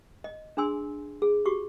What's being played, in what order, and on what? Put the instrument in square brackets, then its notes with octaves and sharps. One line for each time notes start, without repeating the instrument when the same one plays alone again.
[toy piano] D#5
D4 G#4 G#5 C6 E6
G#4
F#4 G4 C#6 D6